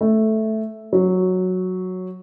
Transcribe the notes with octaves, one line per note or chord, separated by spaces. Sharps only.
A3
F#3